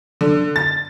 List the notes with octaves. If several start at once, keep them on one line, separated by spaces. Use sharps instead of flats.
D3
A6